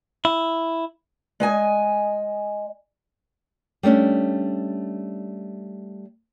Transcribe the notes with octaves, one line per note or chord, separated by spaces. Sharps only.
E4
G#3 D#5 G#5
G3 A3 C#4 D4